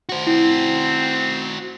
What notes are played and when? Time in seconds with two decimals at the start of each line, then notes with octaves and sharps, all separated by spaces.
0.09 F#4 C5
0.27 C4 E4